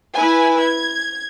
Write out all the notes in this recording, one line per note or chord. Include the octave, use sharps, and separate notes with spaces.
E4 B4 G#5
G#6